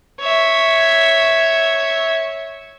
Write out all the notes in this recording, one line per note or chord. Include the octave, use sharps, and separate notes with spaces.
C#5 E5